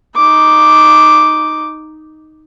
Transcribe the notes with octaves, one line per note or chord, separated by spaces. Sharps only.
D#4 D6